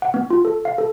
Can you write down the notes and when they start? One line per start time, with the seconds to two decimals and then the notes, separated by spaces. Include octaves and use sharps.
0.02 F#5
0.14 B3
0.30 F4
0.45 A4
0.65 F5
0.78 A4